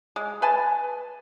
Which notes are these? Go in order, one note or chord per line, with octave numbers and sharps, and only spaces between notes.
G#3
B4 G#5 A5